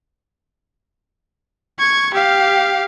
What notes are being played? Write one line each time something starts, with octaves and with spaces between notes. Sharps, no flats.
C#6 G#6
G4 F5